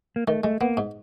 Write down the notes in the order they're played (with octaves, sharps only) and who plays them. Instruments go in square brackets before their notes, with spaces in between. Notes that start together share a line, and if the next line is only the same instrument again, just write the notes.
[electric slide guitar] A#3
[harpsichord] D#3 [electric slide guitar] A3
[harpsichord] G#3 [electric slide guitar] A3
[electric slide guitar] A#3 [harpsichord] B3
[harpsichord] G#2